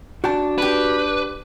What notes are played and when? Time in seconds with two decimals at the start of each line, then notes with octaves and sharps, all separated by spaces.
0.24 D4 F#4 G5 A5
0.58 D4 G4 B4